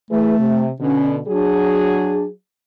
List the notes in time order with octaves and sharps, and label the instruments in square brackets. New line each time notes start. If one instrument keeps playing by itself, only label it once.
[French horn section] E3 G#4 B4 [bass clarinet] A3
[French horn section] C3
[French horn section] B2 D3 [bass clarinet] C#4
[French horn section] F#3 G#4 [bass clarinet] D4